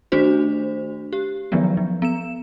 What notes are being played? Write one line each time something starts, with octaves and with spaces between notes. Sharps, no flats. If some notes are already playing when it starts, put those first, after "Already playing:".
D#3 A3 D4 F#4 C5
G4
D#3 F3 F#3 G#3 B3
F3
B3 E7